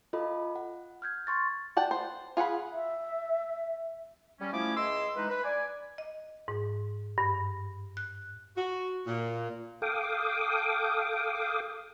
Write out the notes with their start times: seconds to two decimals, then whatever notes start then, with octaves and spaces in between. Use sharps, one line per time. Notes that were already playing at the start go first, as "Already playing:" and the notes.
0.13 F4 A4 D#5 B5
0.56 F#5
1.02 F6 G6 G#6
1.27 C6 C#6 A6
1.77 D5 F#5 G5 A5
1.91 C5
2.37 F4 G#4 F#5 B5
2.72 E5
4.40 G3 C#4
4.52 F3 A3 C#4 E4 G#4 D6
4.76 C#2 D#5 C6 E6
5.16 E3 G#3 D#4 B4
5.29 B4
5.44 D5 G#5
5.98 D#5
6.48 G#2
7.18 G2
7.97 F#6
8.56 F#4
9.06 A#2
9.82 A4 F5 G5 D6 D#6